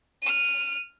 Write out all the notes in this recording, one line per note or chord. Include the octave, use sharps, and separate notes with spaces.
F6 D#7